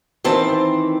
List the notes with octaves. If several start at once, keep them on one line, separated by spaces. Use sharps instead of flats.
D#3 E3 C4 A5